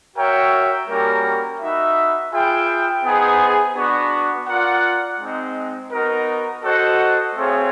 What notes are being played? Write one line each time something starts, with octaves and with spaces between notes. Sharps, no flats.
F#4 A#4 C#5 E5 G5
G3 A#3 C#4 F#4 A#4
D#4 F#4 B4 E5
F4 G#4 B4 E5 G5
B3 D#4 G#4 C5
B3 D4 F#4
F4 A#4 D5 F#5
G#3 C4 D#4
B3 D#4 F#4 A#4
F#4 A4 C5 D#5 F#5
A3 C4 F4 G#4 C#5